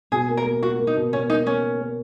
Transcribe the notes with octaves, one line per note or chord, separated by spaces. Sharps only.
B2 G#4
A#3
A#4
A#3
A#3 F#4
A#3
D#4
B2
B2 C#4
A#3 D#4
A#3 C#4
A#3
A#3